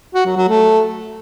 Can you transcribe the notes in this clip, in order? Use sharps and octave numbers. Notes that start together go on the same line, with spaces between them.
F#4
F#3
F#3
A3